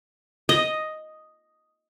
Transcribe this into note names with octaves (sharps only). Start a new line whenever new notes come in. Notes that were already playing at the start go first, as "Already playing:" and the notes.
D#5